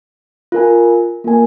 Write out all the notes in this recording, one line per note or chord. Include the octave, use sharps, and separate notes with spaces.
F4 A#4 G#5
A#3 F4 A#4 G#5